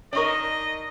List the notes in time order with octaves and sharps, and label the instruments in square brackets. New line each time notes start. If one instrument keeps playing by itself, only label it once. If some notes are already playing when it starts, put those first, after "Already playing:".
[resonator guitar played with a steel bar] D4 D#4 A#4 [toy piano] C#5 C#6 [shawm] D#5